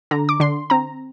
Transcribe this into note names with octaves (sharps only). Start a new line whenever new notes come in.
D3 A#5
D6
D3 C6
C4 A#5